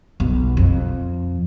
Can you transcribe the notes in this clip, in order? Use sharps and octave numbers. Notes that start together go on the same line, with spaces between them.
B1
F2